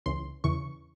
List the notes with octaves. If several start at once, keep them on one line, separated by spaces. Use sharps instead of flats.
C#2 C#3 E3 C6
E2 C#3 E3 C#6